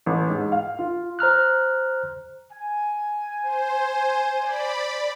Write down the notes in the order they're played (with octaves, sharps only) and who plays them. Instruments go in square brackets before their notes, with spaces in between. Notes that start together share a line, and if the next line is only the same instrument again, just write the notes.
[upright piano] A1
G#2
F5
F4
[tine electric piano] C5 A#5 F6 F#6
[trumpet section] G#5
[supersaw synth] C5
D5 B5